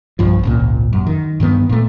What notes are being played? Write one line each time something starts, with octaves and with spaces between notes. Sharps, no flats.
B1 G2 F3
G#1 C#2 A#2
F#2
D#3
G2 D#3 F#3 B3
A#2 A3